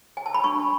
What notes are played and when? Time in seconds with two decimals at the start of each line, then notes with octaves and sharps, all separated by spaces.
0.17 G#5
0.26 A5
0.34 B5
0.44 D4 C#6